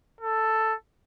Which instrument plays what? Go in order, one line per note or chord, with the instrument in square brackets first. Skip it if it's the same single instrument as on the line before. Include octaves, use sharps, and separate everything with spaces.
[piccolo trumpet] A4